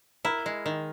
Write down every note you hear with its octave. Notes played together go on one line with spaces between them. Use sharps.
E4 A#4
G#3
D#3